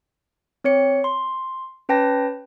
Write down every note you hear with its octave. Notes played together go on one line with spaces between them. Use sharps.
C4 C#5 C#7
C6
C#4 B4 G5 A5 A#6